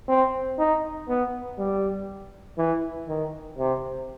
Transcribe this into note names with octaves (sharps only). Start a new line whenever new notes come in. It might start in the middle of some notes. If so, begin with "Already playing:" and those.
C4
D#4
B3
G3
E3
D#3
C3